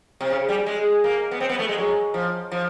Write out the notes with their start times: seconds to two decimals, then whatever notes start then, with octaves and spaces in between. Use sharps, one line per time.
0.21 C3
0.30 C#3
0.49 G3
0.66 G#3
1.04 A#3
1.31 B3
1.40 C4
1.49 B3
1.59 A3
1.69 G#3
1.78 F#3
2.14 F3
2.52 F3